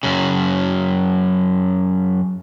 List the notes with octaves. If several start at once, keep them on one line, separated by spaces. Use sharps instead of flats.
F#2 C#3